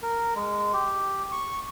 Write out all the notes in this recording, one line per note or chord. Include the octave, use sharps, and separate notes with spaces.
A#4
G#3
G4
C#6